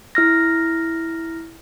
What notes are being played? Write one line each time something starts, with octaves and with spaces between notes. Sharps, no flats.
E4 F6 A#6